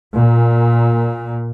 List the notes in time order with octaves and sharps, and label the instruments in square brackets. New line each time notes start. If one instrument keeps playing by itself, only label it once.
[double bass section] A#2